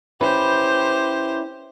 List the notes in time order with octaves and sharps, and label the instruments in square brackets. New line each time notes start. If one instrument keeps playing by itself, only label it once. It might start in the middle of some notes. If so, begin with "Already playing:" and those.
[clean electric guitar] C#4 E4 B4 [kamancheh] G4 C5